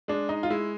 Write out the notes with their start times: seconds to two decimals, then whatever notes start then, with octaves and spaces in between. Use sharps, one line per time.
0.08 G#3 D4
0.29 D#4
0.43 F4
0.50 G#3 E4